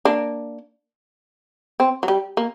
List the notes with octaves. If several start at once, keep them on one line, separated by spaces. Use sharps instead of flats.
A#3 D4
C4
F#3
G3
A#3